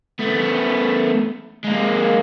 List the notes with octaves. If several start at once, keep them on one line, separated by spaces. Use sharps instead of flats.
A3 B3
G#3 A#3